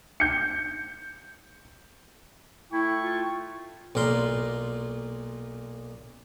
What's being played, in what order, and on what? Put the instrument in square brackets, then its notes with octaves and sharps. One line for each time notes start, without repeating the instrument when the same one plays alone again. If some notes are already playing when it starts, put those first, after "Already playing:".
[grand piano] G6 C#7
[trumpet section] A3 G5 C#6 [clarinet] E4
[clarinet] F4
[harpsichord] B1 A#2 A#4 C6